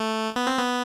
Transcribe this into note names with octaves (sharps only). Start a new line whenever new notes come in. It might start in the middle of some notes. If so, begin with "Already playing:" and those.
Already playing: A3
B3
C4
B3